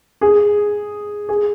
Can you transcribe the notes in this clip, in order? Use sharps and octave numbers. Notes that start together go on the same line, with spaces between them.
G#4
G#4